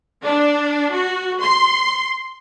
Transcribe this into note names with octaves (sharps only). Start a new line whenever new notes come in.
D4
F#4
C6